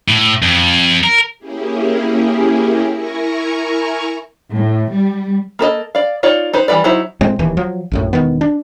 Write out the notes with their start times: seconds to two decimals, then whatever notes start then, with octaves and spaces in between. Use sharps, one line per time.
0.08 A2
0.42 F2
1.04 A#4
1.39 A#3 C#4 E4 G4 G#4
2.93 E4 A#4 G#5 A#5 C#6
4.52 A2
4.90 G3
5.59 A#3 A4 B4 D#5
5.95 D5 F5
6.23 D#4 F4 C#5 D5
6.53 D#4 B4 C5
6.68 E3 G3 F4 B4 D5
6.84 F#3 D#4 E4 C5
7.21 A2 G#3 C4
7.39 D1 D#2 E3
7.57 F3 F#3
7.91 A#1 F#2 A2
8.13 E1 C#2 D#3 B3
8.41 D4